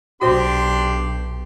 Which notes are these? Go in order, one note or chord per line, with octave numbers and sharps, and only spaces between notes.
B1 D4 F#4 G4 C5 C6